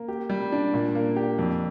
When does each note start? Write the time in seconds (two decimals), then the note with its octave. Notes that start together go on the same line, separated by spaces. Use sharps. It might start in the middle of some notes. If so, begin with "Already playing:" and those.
Already playing: A#3
0.08 G4
0.30 G3
0.52 D4
0.74 A#2
0.95 A#3
1.16 G4
1.39 F2